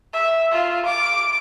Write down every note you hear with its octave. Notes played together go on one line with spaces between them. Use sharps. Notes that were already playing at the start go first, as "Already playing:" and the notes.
E5
F4
D6